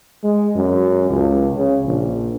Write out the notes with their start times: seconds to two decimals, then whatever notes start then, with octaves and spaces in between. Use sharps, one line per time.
0.24 G#3
0.56 F#2
1.10 C#2
1.56 C#3
1.86 A#1